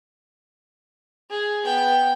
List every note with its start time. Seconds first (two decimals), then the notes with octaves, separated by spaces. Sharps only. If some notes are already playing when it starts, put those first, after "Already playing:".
1.30 G#4
1.65 B3 G5